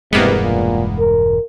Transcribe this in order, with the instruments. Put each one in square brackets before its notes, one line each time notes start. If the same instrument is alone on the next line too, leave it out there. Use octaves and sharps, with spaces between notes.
[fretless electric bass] E1 G2 G#3 [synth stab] E2 A#3 B3 [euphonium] C3
[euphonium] A#2
A#4